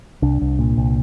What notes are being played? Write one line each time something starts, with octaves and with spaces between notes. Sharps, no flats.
C2 D4
C2
A#2
C2